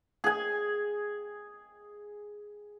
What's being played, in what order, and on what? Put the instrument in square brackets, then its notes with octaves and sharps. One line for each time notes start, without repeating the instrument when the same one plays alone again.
[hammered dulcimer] G#4 G#5